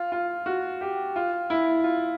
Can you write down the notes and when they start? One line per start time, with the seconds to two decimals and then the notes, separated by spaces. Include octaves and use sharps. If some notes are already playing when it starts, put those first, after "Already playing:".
Already playing: F4
0.12 F4
0.46 F#4
0.81 G4
1.16 F4
1.50 E4
1.84 F4